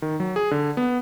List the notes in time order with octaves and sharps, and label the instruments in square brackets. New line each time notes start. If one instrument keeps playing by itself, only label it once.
[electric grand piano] D#3
F#3
G#4
D3
B3